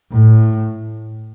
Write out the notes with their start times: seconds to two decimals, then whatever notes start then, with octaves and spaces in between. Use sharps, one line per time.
0.13 A2